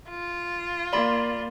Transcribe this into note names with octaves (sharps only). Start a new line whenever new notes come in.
F4
A#3 D5 B5 C6